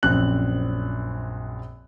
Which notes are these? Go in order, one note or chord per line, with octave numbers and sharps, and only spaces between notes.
A#1 F#2 C4 F#6 F#7